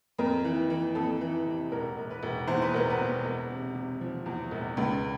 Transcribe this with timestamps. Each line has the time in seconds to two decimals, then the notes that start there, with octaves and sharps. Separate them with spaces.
0.19 F2 A#4
0.45 E3
0.70 E3
0.95 F2 A4
1.21 E3
1.46 C3
1.71 E1 A#4
1.97 E1
2.10 B4
2.23 E1
2.47 E2 C5
2.62 B4
2.74 E1 A#4
2.90 B4
2.98 B2
3.25 E1
3.50 C3
3.75 C3
4.01 F3
4.26 E2
4.51 E1
4.77 C#2